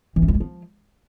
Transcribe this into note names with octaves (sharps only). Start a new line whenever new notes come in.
E3
C#4
F3
G3
F3